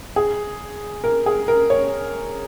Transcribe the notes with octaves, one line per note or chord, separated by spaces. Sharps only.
G#4
A#4
G#4
A#4
C#5